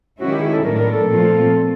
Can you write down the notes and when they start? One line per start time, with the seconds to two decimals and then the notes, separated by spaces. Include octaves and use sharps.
0.20 D#3 G#3 C#4 E4 F#4
0.31 G4
0.42 G#4
0.53 A4
0.64 A2 F#3 B3 D4 A#4
0.78 A#4
0.92 A4
1.07 A#2 F3 A3 C4 F4